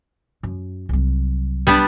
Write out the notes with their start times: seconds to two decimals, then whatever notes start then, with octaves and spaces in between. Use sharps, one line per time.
0.43 F#2
0.89 C2 F#3
1.67 G3 B3 D4